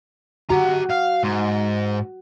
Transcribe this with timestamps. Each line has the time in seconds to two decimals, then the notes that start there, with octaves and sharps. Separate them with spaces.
0.50 F#4 G4 A#5
0.91 F5
1.24 G#2